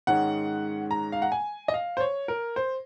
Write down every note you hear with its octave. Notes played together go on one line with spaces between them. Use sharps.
G#2 D#3 G#3 C#4 F#5
A#5
F5
F#5
G#5
D#5
F5
C5
C#5
A#4
C5